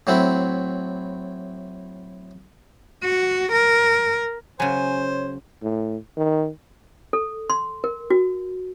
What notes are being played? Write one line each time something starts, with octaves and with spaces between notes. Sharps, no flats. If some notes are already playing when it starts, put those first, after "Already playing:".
A2 F#3 C4 E4
F#4
A#4
C#3 F#3 C5 C#5 G#5
A2
D#3
A4
C6
A#4
F#4